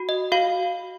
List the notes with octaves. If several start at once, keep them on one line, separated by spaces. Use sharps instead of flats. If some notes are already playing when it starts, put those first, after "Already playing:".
Already playing: F#4
D#5
F#4 F5